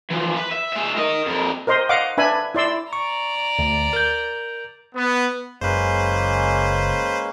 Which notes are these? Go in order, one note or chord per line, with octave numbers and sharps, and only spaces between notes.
E3 F3
B4
E5
G#3 E5
A#4 D#5
F2 A#4
A#4 C5 D#5 C6
D#5 F5 F#5 D6
D4 B4 E5 G#5 B5
E4 D5 C6 E6
D5 A#5 C#6
D2
A#4 G6
B3
F#1 G#3 A#3 C#4 B4 C5